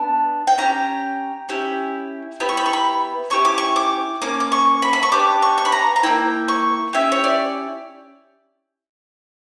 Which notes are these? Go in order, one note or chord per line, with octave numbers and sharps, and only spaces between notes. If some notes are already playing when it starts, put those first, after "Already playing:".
Already playing: B3 D4
G5
C#4 E4 G4 A#5
C#4 E4 G4
B3 E4 G4 B5
C#6
B5
C#6
B5
C#4 E4 G4 C#6
D6
C#6
D6
A#3 C#4 D6
D6
C#6
B5
B5
C#6
B3 D4 G4 D6
C#6
C#6
B5
A#5
A#5
A#3 C#4 E4 G5
C#6
C#4 E4 G4 E5
C#5
D5